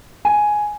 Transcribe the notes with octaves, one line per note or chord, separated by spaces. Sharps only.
G#5